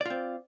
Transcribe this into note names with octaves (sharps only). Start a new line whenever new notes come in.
C4 F4 D5